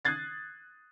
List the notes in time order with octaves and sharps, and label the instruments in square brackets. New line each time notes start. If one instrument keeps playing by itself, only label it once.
[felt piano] D#6 F#6 G#6 A6 C7